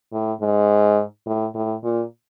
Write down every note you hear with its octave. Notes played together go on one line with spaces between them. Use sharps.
A2
G#2
A2
A2
A#2